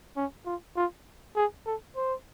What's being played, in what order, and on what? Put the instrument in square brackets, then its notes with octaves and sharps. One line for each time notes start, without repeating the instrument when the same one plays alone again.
[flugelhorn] C#4
F4
F4
G#4
A4
C5